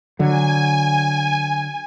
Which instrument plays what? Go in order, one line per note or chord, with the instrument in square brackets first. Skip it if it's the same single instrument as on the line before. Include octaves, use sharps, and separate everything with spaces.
[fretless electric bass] D3 F#3 [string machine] G#5